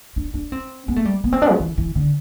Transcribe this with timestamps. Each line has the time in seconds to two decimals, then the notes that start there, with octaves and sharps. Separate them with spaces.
0.16 D4
0.34 D4
0.52 C4
0.88 B3
0.96 A3
1.05 G3
1.24 B3
1.33 C4
1.42 D4
1.51 F3
1.60 E3
1.78 E3
1.95 D3